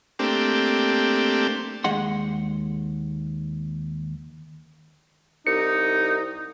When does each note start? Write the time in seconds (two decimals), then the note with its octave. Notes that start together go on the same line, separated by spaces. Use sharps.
0.19 A3 A#3 C4 D4 G4
1.84 D#2 G#3 G#4 D#5 F#5 C6
5.47 C2 D#4 C#7